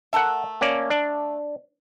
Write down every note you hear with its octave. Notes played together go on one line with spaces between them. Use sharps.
A3 A4 A#4 E5 F#5
A#3 C#4 D5
D4